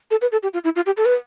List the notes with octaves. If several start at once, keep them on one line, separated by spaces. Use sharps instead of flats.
A4
B4
A4
G4
F4
E4
F4
G4
A4
B4